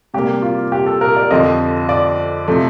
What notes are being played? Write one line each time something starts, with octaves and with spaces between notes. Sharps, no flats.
C3 G3 A#3 G4
F4
G4
A4
A#4
D5
F2 D3 F3 D#5
D5
C3 F3 A3